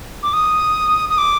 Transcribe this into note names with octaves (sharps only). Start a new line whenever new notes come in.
D6
D#6
D#6
D6